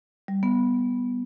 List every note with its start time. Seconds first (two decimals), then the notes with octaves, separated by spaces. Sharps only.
0.28 G3
0.43 B3